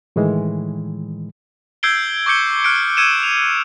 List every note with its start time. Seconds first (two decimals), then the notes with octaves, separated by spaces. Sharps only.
0.16 A2 D#3 E3 G#3
1.83 E6 G6 G#6 C7 D7 G7
2.26 C#6 D6 G6 C#7 G7
2.64 F6 F#6 C#7 D7
2.97 E6 G#6 C#7 D#7 E7
3.23 F7